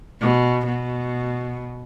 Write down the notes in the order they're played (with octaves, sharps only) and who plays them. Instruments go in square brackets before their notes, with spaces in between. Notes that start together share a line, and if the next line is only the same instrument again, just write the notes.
[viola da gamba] B2
B2